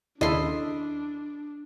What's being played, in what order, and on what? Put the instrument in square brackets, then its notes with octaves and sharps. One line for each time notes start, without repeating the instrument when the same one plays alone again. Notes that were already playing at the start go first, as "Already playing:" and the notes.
[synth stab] D#2 C#3 [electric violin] D4 [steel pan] E4 A4 [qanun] D#5 C6